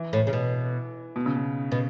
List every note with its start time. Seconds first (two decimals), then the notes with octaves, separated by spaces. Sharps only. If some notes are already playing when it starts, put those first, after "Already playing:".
Already playing: E3
0.13 A2
0.27 C#3
0.33 B2
1.16 B2
1.26 C#3
1.36 B2
1.72 B2